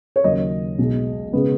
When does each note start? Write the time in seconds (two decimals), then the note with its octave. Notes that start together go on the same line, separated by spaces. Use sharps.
0.16 C#5
0.24 D#2 C#3 F#3 A#3 D#5
0.79 B1 B2 G#3
1.33 C#3 G#3 B3